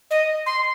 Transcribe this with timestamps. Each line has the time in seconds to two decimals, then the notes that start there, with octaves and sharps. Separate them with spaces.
0.11 D#5
0.46 C6